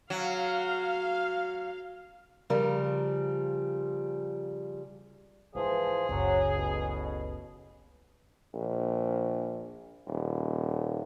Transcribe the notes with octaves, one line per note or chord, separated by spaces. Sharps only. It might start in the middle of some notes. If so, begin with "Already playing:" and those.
F#3 F5
C#3 F3 G3 A#4
G#1 E3 F3 G#4
F#1 C#2 F#3
A1 B2
A#1
D#1